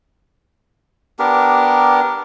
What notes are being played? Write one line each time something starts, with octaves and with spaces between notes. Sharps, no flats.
B3 D4 G4 A#4